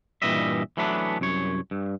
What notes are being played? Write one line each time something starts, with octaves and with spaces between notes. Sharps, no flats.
G2 A#2 E3 G3 D#5 E5
E3 F#3 A3 B3 C#4 D4
C2 F#2 C#5
G2